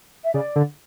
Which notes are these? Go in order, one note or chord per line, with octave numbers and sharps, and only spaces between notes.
E5
C#3 D5
D3